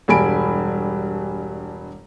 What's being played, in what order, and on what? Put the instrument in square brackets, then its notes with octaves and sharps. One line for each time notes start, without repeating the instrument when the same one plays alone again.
[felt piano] E1 G2 G#5 B5 D7